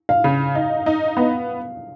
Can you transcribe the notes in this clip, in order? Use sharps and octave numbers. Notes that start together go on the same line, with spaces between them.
F5
C#3
D#4
D#4
B3